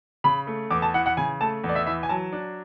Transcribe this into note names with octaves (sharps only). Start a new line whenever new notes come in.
C#3 B5
A3
E2 D6
A5
E3 F#5
F#5
C#3 G#5
A3 A5
E2
D5
E5
E3 E5
G#5
F#3 A5
D4